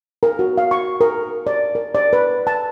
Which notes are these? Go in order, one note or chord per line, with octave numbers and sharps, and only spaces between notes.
A#4
F#4
F5
C#6
A#4
D5
A#4
D5
B4
A5